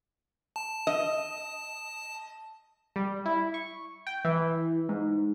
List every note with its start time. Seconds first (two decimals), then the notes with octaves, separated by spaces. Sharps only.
0.56 A5
0.87 D#5
2.96 G3
3.26 E4
3.54 C#6
4.07 G5
4.25 E3
4.89 G#2